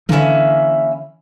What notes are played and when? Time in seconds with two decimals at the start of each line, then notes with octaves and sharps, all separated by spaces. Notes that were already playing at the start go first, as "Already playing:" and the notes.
0.09 D3 E3 A#3 C#4 E4